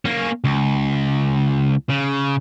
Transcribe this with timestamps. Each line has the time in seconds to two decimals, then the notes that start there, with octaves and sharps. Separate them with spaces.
0.05 A#3 C#4
0.44 C#2
1.89 C#3